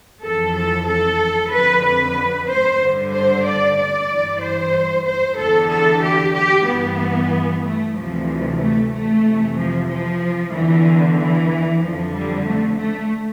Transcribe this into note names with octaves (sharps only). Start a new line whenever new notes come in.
F2 E3 A4
A4
A4
F2 D3 B4
B4
C5
G2 D3
C5
D5
D5
G2 E3
C5
C5
E2 D3 A4
A4
G4
G4
G2 E3 B3
A3
D2 C3 E3 F3
A3
A3
F2 C3 E3
F3
F3
E2 D3 E3
E3
F2 D3 F3
G3
A3
A3